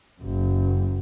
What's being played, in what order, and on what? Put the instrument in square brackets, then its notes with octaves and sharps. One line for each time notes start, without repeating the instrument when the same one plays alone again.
[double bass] F#1 F#2